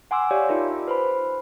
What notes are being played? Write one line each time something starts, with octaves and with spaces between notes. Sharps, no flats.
F#5 G#5 C6 D6 E6
G4 C#5 D5 F5
D#4 F4 A#4 E5
B4 C5 B5